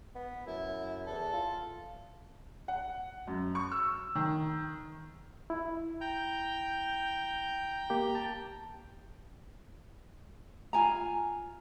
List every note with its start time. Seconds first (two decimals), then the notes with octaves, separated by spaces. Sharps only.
0.15 B3
0.46 F#2 E4
1.07 E2 A4
1.33 F4
2.68 F#5
3.27 F#2
3.55 C#6
3.72 E6
4.15 D#3
5.50 E4
6.01 G5 A#5 G6
7.90 A#3 G4
8.15 A5
10.73 F4 G#5 A#5